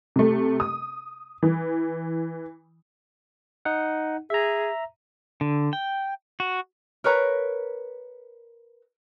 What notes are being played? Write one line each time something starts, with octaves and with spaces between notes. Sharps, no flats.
C3 A3
D#6
E3
D#4 F#5
G#4 E5 A#5
D3
G5
F#4
A#4 B4 C#5 A#5